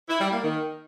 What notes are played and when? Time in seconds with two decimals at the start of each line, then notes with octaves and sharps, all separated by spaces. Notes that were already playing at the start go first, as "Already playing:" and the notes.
0.09 E4
0.20 G3
0.32 A#3
0.44 D#3